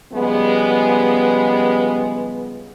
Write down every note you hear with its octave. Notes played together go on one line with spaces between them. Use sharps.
C#3 F3 G3 G#3 B3